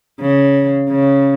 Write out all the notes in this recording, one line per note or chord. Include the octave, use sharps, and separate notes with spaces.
C#3
C#3